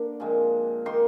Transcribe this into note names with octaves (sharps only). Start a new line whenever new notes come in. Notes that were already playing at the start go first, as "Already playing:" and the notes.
Already playing: D3 A#3 D4
A#2 F3 G#3 C4
D#3 A#3 D#4 C6